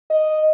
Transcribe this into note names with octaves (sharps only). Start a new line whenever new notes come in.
D#5